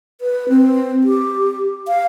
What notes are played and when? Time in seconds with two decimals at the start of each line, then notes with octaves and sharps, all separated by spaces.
0.21 B4
0.49 C4
1.04 G4
1.88 F5